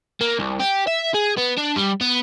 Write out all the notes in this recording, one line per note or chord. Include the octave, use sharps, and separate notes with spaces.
A#3
C2
G4
E5
G#4
B3
D4
G3
B3